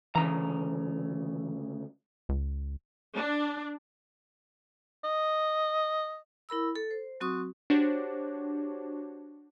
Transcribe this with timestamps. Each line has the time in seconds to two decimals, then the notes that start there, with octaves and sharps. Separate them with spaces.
0.15 D2 C#3 E3 A#5
2.29 C#2
3.14 D4
5.04 D#5
6.49 E4 A#4 B5 E6
6.75 A4
6.91 C5
7.20 F#3 C4 F#4 C#6 D#6
7.70 D4 F#4 G4 C5 C#5